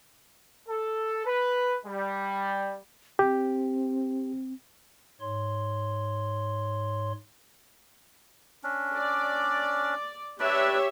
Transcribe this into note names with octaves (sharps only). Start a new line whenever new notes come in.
A4
B4
G3
C4 G4
G#2 C#5 C6
C#4 D4
D5
D4 G4 B4 C#5 D5 E5